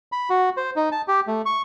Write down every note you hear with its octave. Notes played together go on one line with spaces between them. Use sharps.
B5
F#4
C5
D#4
A5
G4
A3
C#6